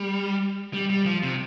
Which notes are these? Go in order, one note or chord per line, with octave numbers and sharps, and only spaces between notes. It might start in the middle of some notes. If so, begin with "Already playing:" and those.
Already playing: G3
G3
G3
F3
C3